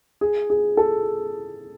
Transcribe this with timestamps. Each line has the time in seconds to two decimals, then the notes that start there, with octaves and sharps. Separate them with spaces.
0.21 G#4
0.50 G#4
0.77 A4